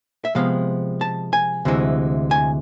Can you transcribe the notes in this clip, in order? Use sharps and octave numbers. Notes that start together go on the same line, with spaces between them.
E5
C3 F3 G#3 B3 F5
A5
G#5
D2 C3 E3 G#3
G#5